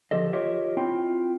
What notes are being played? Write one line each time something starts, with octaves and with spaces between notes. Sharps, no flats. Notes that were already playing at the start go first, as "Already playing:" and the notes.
D2 F3 G4 A4 D#5
F4 G4 A#4 C#5 D#5 E5
C4 E4 F4 G5